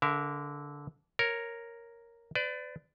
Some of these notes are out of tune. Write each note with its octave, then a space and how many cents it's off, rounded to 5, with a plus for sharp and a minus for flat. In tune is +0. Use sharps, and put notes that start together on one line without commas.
D3 -20 A#4 +0 E5 +15
A#4 +0 C#5 -5
B4 +40 D5 +0